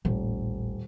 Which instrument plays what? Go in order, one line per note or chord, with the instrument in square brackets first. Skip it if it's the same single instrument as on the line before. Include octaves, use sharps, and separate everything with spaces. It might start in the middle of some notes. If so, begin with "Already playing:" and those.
[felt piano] D#1 [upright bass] A1